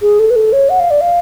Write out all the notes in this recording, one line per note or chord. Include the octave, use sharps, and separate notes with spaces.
G#4
A4
B4
A4
C#5
F#5
F5
D5
F5